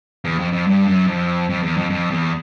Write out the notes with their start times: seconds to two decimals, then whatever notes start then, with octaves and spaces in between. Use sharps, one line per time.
0.24 E2
0.38 F2
0.53 F2
0.67 G2
0.87 F#2
1.07 F2
1.50 F2
1.63 E2
1.77 F2
1.90 F2
2.10 E2